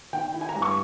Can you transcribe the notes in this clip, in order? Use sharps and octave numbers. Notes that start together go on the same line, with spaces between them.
D#3 G5
E4
G#5
A#5
G2
C#6